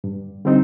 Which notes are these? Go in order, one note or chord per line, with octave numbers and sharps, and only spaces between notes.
G2
D3 G3 C4 D#4